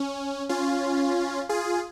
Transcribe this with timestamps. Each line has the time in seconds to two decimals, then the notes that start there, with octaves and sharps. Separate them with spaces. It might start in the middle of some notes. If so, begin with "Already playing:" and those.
Already playing: C#4
0.49 C#4 F4
1.49 F4 G#4